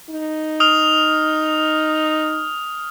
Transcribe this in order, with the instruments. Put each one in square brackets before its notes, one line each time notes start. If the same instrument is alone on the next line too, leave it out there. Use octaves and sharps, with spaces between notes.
[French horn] D#4
[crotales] D#6 F6 F7